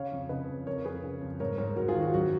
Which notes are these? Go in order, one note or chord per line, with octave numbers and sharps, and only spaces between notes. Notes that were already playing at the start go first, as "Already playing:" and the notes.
Already playing: C#3 C#5 F5
F2
C#3 B4 D#5
F2
F2 A#4 C#5
F2 G#4 B4
C#3
F2
G#2 A#4 C#5
G#2 A#4 C#5
G#2 F#4 A#4
F4 G#4
D#3
F#4
F#2 F#4